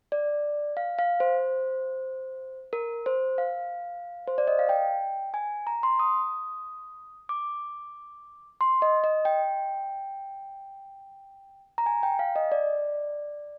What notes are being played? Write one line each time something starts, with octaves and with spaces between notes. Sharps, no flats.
D5
F5
F5
C5
A#4
C5
F5
C5
D5
D#5
F5
G5
G#5
A#5
C6
D#6
D6
C6
D#5
D#5
G5
A#5
G#5
G5
F5
D#5
D5